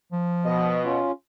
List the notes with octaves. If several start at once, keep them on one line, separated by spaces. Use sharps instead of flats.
F3
B2 D#5
C#4 F4